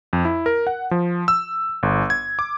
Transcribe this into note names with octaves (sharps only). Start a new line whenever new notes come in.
F2
E4
A#4
F#5
F3
E6
G1
G#6
D6